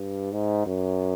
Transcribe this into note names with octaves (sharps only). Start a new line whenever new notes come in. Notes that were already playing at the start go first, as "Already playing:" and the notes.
Already playing: G2
G#2
F#2